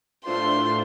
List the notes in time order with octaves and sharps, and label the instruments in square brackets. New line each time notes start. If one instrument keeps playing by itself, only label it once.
[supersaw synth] A2 A3 D4 F4 C5 [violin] C6